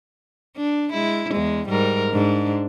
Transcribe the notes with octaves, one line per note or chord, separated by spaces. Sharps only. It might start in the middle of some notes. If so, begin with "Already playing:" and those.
D4
G#3 E4
E2 G#3
G#2 G3 A#4
G#2 D4